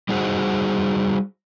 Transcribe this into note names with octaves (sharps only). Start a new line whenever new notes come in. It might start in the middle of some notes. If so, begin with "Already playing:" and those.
G3 D#4 F#4 G#4 C5 F#5